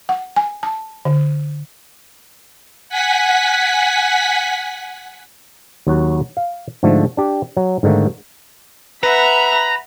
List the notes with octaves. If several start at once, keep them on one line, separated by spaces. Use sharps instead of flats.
F#5
G#5
A5
D3
F#5 G#5 B6
D#2 F#3 F#4
F5
G#2 D3 F3 A3
D4 G4
F#3
G#2 D3 D#3 A3 A#3
B4 E5 F#5 A#5 B5